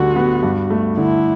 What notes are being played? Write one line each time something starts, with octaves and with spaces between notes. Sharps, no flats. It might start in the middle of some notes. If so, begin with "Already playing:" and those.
Already playing: D2 D3 G3 F#4
B3
G2
A3
D3 E4